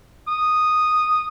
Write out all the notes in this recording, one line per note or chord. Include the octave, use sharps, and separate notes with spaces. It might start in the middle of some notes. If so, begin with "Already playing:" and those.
D#6